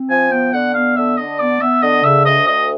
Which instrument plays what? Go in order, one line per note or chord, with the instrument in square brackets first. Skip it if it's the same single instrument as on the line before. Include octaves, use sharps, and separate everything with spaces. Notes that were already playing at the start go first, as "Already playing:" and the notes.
Already playing: [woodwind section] C4
[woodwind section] F3 [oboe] G#5
[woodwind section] B3 [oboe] G5
[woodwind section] D3 [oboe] F#5
[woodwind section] B3 [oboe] F5
[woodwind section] D3 [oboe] E5
[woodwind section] D3 [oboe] D#5
[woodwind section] B3 [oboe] D5
[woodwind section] B3 [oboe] E5
[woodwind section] D3 [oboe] D#5
[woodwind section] C#3 [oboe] E5
[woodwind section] D2 [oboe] D#5
[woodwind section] D2 [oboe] D#5